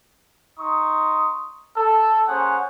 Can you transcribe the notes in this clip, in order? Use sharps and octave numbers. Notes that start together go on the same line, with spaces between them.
D#4 C6 C#6 D#6
A4
A#3 C#4 G#4 C5 F#5